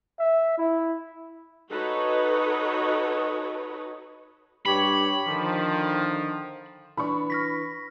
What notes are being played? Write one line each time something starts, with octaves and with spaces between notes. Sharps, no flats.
E5
E4
D#4 F#4 A4 B4 C#5 D#5
G2 G4 C#5 B5
D3 D#3 F3
E3 D4 B5 C#6
F6 A#6 B6